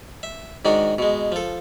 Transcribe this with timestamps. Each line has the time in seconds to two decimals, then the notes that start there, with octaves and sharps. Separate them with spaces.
0.23 E5
0.65 G#2 D#3 D4 F#4
0.98 B2 G#3
1.32 F3 A4